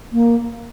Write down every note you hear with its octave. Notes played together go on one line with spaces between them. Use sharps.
A#3